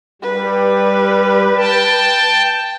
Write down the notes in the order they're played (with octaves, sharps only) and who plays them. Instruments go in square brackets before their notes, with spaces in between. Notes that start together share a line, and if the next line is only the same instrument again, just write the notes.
[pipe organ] G3 [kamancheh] B4
[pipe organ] G5 A5